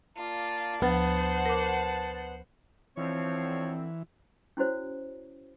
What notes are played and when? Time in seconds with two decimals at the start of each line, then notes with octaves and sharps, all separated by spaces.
0.17 A#3 F4 D5 A5
0.82 D2 F3 B3 C5 F#5 A5 A6
1.46 A#4 D6
2.97 D3 E3 F3 C4 C#5
4.57 C#4 E4 F#4 C5 C#5